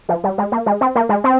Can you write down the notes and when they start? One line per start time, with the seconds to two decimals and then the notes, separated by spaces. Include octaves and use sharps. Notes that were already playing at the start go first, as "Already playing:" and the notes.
0.09 F3
0.24 G3
0.38 G#3
0.52 A#3
0.66 G#3
0.81 C4
0.95 A#3
1.09 G#3
1.24 C4